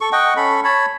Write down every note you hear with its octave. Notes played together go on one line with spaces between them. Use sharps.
A4 C#6
D#5 F#5 G5 C#6
C#4 A4 B5
C#5 A5 B5